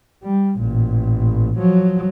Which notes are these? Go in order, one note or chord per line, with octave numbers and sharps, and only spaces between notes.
G3
A1 A#2
F3 F#3